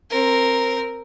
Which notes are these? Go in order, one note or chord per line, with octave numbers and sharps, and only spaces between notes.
C4 A#4